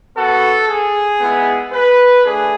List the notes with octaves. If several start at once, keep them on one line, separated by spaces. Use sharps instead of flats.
B3 F#4 A4
G#4
G#3 B3 E4
B4
A3 D4 G#4